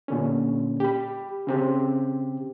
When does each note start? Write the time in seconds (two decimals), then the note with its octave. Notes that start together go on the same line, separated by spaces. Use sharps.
0.08 A#2 D3 C#4
0.80 G4 B5
1.47 C#3 C4 G4